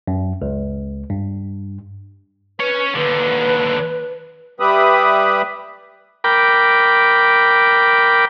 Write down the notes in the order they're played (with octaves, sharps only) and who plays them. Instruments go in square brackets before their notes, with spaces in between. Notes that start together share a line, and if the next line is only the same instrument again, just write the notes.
[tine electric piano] F#2
C#2
G2
[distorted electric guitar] C#4 C#5 [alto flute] B4
[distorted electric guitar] D#2 D3 [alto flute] B4
[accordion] G3 G4 B4 E5 B5 D#6
[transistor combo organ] A#4 G5 B5 D6